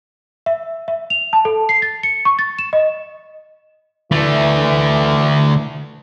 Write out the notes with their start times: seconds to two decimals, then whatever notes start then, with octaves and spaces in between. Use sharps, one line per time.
0.46 E5
0.88 E5
1.10 F7
1.33 A5
1.45 A4
1.69 C7
1.82 A6
2.03 C#7
2.25 C#6
2.39 A6
2.59 E7
2.73 D#5
4.12 D3 E3 A3